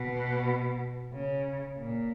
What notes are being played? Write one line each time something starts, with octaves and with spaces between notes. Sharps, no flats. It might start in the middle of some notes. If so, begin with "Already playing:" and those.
Already playing: B2
C#3
A#2